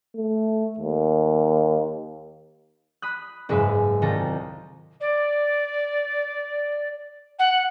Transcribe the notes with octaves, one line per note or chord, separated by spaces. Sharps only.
A3
D#2
B5 D#6 F#6
F#1 G#2 G#3 B4 E5
C2 D#3 F4 A4 A#5
D5
F#5